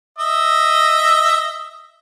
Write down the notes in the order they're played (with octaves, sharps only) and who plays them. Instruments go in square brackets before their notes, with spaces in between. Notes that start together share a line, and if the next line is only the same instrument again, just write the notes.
[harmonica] D#5 E5